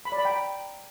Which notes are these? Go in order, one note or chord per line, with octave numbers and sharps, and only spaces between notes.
B5
D5
B5
G5
A#5